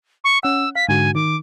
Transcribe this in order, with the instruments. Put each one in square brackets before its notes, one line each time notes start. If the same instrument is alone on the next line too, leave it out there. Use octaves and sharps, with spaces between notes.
[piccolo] C#6
[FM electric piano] C#4 F#5 [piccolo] E6
[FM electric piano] F5 [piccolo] B6
[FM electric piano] G#2 D3 F#4 [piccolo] G#5
[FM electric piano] D#3 [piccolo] D6